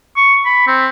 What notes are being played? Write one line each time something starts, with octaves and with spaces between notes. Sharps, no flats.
C#6
B5
C4